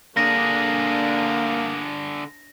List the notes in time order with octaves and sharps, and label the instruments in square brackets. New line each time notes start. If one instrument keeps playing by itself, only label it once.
[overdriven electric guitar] D3 G#4 [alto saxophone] A#3 [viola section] D4 [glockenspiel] A#6